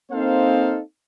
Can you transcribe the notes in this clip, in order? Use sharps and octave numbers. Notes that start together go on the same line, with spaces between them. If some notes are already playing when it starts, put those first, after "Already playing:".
A#3 C4 D#4 A4 C5 F5